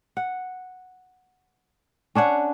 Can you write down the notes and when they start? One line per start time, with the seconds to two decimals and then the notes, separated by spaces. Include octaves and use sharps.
0.17 F#5
2.15 C#4 D4 C#5 F#5